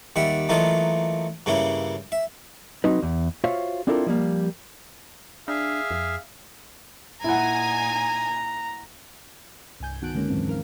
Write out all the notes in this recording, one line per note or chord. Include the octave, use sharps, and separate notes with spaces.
D#2 G3 E5 F#5
E3 F#3 A3 A#3 F4 D#5
G2 C#3 A#3 C#4 E4
E5
F#3 C4 D#4 B4
E2
F4 F#4 C5 C#5 E5 F5
C4 D4 E4 F4 A4 A#4
F3 G3 A#3
D4 G#4 E5 F5
F2
A#2 D#4 E4 F#5 G#5 A#5
C2 G2 G#5 G6
D#3 B3 F#4 A5 F#6 D7
D3 G#3 A#3 C#4
D#2 G#2 E3 F#3 A#3 C4
D#3 A#4 F5